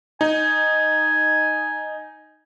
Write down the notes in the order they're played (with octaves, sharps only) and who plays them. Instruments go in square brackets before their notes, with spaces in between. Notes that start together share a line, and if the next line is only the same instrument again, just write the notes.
[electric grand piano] D#4 [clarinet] G#5